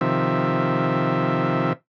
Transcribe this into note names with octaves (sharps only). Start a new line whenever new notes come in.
C3 D#3 F3 E5